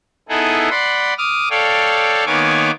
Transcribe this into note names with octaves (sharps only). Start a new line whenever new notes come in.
B3 D#4 E4 G#4 A4
D5 F#5 B5 C6
D6 D#6 F6
A4 C#5 D5 F5 G5
D#3 A#3 B3 C#5 G#5 D6